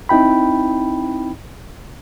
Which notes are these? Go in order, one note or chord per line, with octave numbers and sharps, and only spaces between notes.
C4 D#4 E4 G5 B5